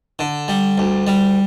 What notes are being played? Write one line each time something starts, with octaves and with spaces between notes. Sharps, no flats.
D3
G3
D2
G3